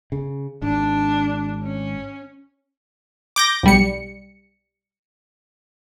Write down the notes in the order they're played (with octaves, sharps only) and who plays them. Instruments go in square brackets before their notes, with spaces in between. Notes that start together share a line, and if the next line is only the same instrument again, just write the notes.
[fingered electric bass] C#3
[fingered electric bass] G#1 [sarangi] D4
[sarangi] C#4
[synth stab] D6 G6 A#6
B1 G3 C#7